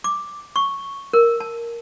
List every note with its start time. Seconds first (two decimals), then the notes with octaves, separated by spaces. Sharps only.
0.04 D6
0.56 C#6
1.13 A#4
1.40 A5